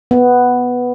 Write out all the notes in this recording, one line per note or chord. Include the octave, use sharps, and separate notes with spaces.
B3